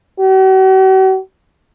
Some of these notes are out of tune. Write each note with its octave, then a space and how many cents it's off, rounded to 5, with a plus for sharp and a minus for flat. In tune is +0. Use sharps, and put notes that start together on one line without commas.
F#4 +45